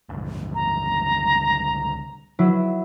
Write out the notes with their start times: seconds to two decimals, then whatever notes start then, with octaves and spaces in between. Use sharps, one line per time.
0.09 G1 C#2 G2
0.55 A#5
2.39 F#3 E4